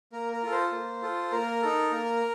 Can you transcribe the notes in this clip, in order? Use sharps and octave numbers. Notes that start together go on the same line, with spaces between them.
A#3 A#4
A#4
F4 A4
C5
A#3
F4 A4
A#3 A#4
D#4 A4
A#3